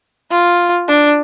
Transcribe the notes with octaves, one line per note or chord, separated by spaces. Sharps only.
F4
D4